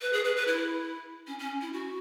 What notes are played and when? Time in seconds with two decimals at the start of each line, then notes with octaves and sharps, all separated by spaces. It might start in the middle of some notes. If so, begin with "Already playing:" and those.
0.01 B4
0.13 G#4
0.24 B4
0.37 B4
0.47 E4
1.27 C#4
1.39 C#4
1.61 E4
1.73 F#4